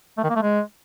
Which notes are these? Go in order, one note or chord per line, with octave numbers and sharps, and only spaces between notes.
A3
D#3
A#3
A3
G#3